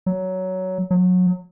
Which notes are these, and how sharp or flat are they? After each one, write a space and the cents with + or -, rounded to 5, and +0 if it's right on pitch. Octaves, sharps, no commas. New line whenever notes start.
F#3 +10
F#3 -25